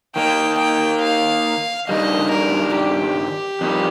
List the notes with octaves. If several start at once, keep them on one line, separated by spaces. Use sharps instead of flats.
D#3 A#3 D#4 G5
G5
F5
G2 D#3 G3 D#5
A#4
G4
F2 D#3 G3